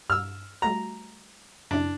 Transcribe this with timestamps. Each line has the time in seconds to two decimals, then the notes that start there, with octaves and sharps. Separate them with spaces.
0.10 G2 E6 F6
0.62 G3 A3 F#4 A#5
1.71 F#2 C#3 D4 E4